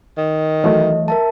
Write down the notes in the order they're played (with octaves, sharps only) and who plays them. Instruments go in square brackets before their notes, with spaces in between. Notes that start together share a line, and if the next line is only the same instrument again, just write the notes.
[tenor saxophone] D#3
[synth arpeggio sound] E3 F#3 A3 [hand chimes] D#5
[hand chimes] A#4 E5 A5